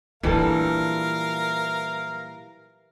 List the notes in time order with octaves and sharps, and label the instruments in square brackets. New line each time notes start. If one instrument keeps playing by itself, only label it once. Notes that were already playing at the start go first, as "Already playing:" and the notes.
[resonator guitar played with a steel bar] A#2 G3 A4 [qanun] E3 [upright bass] F#3 D4 [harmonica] A#4 F5